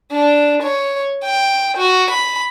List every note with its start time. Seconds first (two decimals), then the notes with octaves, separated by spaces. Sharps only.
0.12 D4
0.63 C#5
1.24 G5
1.77 F#4
2.11 B5